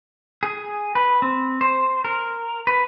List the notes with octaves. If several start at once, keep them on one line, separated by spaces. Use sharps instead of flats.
G#4
B4
C4
C5
A#4
B4